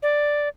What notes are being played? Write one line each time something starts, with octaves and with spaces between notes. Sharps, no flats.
D5